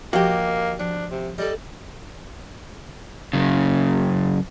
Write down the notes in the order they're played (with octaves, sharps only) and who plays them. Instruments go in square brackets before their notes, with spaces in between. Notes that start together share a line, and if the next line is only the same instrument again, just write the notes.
[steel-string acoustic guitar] F3 D#5 [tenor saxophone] A#3 [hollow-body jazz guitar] F#4 G4
[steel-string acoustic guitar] F3 [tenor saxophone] D4
[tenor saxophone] C3
[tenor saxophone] G3 [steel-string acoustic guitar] A4 D5 D#5
[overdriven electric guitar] F#2 C#3